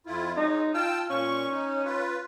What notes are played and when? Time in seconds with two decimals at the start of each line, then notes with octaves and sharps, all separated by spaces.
0.06 F2 E4 F4
0.37 F#3 G#3 D#4
0.74 F4 G5 A5 E6
1.10 A#2 C#4 C#6
1.51 D#4
1.85 F4 B4